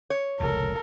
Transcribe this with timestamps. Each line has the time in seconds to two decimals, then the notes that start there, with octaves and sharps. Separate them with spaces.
0.10 C#5
0.40 F1 C#2 A#2 A4 A#4